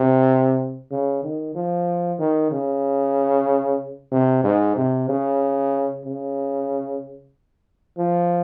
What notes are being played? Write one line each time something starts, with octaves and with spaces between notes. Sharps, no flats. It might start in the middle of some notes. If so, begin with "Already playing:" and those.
Already playing: C3
C#3
D#3
F3
D#3
C#3
C3
G#2
C3
C#3
C#3
F3